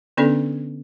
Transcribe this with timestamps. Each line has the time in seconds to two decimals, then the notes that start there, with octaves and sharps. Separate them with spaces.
0.17 D3 B3 C#4 D4 A4 D5